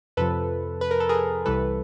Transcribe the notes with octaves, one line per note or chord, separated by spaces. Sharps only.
F2 C3 F3 A4 B4
B4
A#4
A4
G#4 A#4
C2 C3 E3 G3 A4 B4